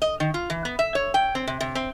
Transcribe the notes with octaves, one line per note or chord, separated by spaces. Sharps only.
D#5
D#3
F4
E3
B3
E5
C#5
G5
C4
C3
C3
C4